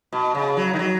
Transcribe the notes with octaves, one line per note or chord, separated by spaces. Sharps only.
B2
C#3
F#3
D#3
F#3